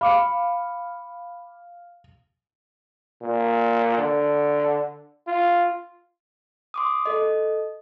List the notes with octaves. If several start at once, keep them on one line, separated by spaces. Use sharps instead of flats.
F5 B5 D6 C#7
A#2
D3
F4
C6 D6 D#6
A4 D#5